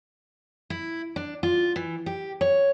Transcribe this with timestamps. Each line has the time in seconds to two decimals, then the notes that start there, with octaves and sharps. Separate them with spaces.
0.70 E4
1.16 D4
1.43 F4
1.76 E3
2.06 G4
2.41 C#5